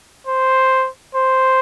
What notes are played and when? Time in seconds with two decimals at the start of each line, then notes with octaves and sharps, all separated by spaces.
0.27 C5
1.15 C5